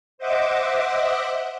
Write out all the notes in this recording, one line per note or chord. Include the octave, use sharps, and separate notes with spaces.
C5 D#5 E5 F#5 D6